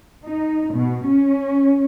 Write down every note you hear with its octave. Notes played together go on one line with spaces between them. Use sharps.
D#4
B2
C#4